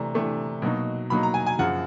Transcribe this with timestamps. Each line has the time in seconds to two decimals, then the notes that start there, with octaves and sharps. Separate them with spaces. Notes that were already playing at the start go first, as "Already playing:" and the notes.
Already playing: C3 E3 A3 D4 A#5
0.14 C3 E3 A3 D4
0.62 B2 F#3 A#3 D#4
1.10 B2 F#3 A#3 D#4 B5
1.23 A#5
1.34 G#5
1.47 G#5
1.59 F#2 C#3 F3 F#5